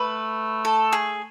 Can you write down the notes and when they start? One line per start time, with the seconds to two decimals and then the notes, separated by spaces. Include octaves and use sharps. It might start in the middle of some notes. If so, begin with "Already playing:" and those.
Already playing: A3 B4
0.65 A4
0.93 G#4